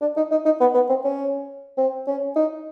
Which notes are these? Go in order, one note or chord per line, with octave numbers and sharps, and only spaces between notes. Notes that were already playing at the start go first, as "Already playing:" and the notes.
D4
D#4
D#4
D#4
B3
B3
C4
C#4
C4
C#4
D#4